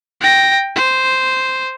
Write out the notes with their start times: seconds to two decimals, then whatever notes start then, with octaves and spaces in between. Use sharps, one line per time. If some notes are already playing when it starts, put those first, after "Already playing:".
0.21 G5 A#6
0.76 C5